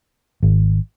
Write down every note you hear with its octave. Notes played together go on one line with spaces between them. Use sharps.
G#1